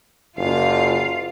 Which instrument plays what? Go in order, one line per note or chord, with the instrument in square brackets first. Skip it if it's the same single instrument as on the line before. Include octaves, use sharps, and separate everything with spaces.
[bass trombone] F#1 [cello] F4 F5